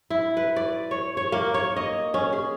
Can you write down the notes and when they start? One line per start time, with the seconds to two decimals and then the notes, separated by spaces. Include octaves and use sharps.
0.10 E4
0.37 B4
0.56 D5
0.91 C#5
1.17 C#5
1.32 A#3
1.54 C#5
1.76 D#5
2.14 C#4
2.33 G#4